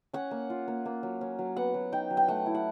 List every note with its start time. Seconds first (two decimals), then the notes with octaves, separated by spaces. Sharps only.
0.13 C#4 F#5
0.31 A#3
0.50 F4
0.68 A#3
0.85 A#3
1.03 F#3
1.21 C#4
1.39 F#3
1.57 B3 F#5
1.74 F#3
1.92 D#4 G5
2.10 F#3
2.17 G5
2.28 A3 F#5
2.46 E4
2.55 F#5